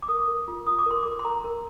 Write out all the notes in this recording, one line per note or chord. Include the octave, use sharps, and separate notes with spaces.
D6
A#4 D#6
A#4
F4
F4 D#6
D6
A#4 C6
A#4 D6
C6
A#4 A#5
A#4